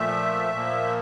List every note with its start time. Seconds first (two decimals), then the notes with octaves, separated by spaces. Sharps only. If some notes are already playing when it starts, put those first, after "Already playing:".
Already playing: A#2 F3 A3 E5
0.52 A#2 F3 A#3